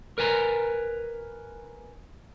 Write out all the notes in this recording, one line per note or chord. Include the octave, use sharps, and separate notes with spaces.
A#4 B4 G#5 A#5